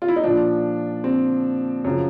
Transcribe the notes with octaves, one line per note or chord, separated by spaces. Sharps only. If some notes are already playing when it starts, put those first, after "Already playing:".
F4
E4
D#4
A#2 F3 D4
C4
F#2 C#3 F3